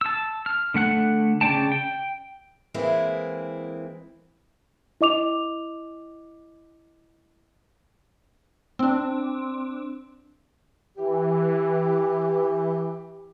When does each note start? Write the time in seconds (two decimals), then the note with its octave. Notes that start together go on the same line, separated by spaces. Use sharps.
0.01 A5 E6
0.46 F6
0.74 D3 A3 F#5 F#6
1.41 C#3 D4 D5 G5 A5
1.72 G5
2.74 E3 G#3 A#3 C4 E4
5.01 E4 D#5 D6 F7
8.79 C4 D4
10.97 E3 G4